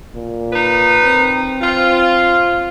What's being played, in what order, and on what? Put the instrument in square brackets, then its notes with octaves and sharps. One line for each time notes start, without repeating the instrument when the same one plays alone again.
[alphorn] A#2
[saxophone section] D#4 B4
[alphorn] C4
[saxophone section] F4